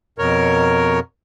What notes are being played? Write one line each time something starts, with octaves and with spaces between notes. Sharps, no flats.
F2 B2 A#4 C#5